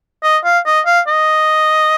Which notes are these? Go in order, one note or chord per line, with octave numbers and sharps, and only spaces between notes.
D#5
F5
D#5
F5
D#5